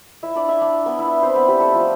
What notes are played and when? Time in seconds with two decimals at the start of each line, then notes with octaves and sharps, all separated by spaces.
0.23 E4 E5
0.35 D4 D5
0.49 E4 E5
0.61 D4 D5
0.86 B3 B4
0.99 E4 E5
1.22 C4 C5
1.35 B3 B4
1.48 G3 G4
1.60 A3 A4
1.73 F3 F4